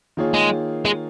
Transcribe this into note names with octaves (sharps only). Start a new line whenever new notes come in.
D#3 A#3 F4 G#4 C#5
G#3
G#3